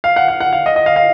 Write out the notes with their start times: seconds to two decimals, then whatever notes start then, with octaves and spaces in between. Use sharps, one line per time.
0.04 F5
0.16 F#5
0.28 F5
0.40 F#5
0.53 F5
0.66 D#5
0.76 D#5
0.86 F5
0.96 F5